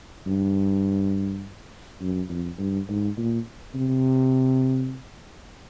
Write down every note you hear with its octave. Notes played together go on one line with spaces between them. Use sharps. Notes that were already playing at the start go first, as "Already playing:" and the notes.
G2
F#2
F2
G2
G#2
A#2
C3